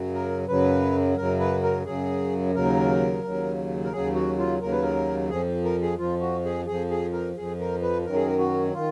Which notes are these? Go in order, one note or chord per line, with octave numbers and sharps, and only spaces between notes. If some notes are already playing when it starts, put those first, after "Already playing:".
Already playing: F#2 C#3 F#3
A#4
F#2 C#3 F#3 B4
F#2 C#3 F#3 A#4
B4
A#4
F#2 C#3 F#3 G#4
D#2 C#3 F#3 A#4
D#2 C#3 F#3
A#4
D#2 C#3 F#3 G#4
F#4
F4
D#2 C#3 F#3 A#4
B4
A#4
F2 F3 G#4
A#4
G#4
F2 F3 F4
F#4
G#4
F2 F3 G#4
G#4
A#4
F2 F3 G#4
A#4
B4
F#2 D#3 F#3 A#4
G#4
A#4
F#4
D#3 F4